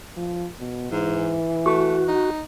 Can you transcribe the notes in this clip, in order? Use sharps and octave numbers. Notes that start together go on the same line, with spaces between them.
F3
B2
G#2 E3
A3 F#4
D#4